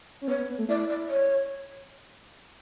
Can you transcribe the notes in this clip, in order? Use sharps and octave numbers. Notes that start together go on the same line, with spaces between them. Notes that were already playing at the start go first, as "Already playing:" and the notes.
C#4
B3 C#5
B3
B3
A3
E4 D5
D5
C#5